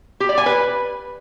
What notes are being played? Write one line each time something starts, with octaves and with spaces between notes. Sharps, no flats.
G4
D5
G#5
B4